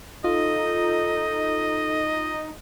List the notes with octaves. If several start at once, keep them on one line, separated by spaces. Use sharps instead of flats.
D#4 F4 A4 D#5